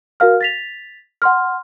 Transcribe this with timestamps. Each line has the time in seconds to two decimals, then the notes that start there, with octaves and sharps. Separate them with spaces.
0.20 F#4 A#4 F5 F6
0.41 A6 B6 F7
1.22 F#5 C6 F6